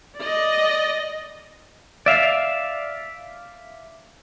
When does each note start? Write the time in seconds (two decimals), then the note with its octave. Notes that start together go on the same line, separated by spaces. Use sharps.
0.18 D5 D#5
2.06 D5 E5 F5